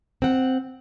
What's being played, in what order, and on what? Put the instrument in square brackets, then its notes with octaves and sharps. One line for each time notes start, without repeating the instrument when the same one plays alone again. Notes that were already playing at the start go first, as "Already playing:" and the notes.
[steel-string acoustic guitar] C4 F#5